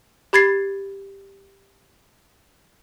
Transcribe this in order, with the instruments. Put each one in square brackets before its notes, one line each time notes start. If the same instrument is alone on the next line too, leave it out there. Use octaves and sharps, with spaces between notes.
[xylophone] G4 B5 G#6 A6 C7